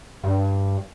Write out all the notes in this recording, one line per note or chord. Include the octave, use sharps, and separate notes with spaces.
G2